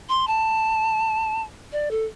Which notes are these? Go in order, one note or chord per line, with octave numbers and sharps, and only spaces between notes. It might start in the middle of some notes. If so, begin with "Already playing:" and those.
C6
A5
D5
A4